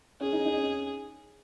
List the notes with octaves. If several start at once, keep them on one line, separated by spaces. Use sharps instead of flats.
C#4 G#4
D#4
D#4
C#4